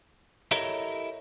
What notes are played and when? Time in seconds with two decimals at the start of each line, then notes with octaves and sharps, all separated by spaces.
0.51 E4 G4 A4 A#4 C#5 D#5